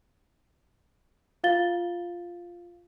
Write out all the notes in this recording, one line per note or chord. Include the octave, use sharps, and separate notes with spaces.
F4 F5 A6 G7